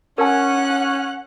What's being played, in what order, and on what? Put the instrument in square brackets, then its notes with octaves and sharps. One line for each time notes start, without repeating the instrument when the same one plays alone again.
[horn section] C#4 [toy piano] A#4 G#5 [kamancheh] F#5 F#6